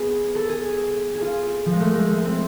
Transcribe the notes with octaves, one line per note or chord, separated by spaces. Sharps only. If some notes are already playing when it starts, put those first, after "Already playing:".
Already playing: B3 G#4
A4
G#4
G#4
F4
F3
G#3
A3
G#3
A3
C4